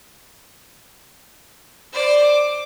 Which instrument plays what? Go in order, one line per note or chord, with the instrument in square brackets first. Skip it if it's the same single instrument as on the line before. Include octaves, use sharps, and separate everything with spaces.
[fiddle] C5 D5
D6